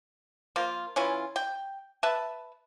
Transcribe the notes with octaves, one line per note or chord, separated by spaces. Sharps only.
F3 A#3 F4
E3 C#4 E4 F4
G5
B4 E5 A5